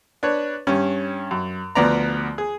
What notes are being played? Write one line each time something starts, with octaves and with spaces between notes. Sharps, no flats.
D4 B4 C#5
G2 C#4
F#2
D2 F3 B3 D5 A#5
G#4